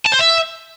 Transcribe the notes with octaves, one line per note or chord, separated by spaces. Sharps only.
A5
C5
E5